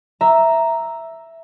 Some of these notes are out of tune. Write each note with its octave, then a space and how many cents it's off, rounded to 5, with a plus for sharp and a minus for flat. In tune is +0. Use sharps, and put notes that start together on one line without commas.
E5 +0 A#5 +0